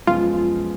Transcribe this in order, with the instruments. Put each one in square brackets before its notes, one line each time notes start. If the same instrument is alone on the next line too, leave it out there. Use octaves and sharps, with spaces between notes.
[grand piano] F#2 F3 G#3 B3 [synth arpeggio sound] F4